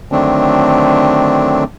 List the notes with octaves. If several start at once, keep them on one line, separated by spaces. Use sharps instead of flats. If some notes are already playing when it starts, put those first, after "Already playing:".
D3 D#3 F#3 A3 C4 D4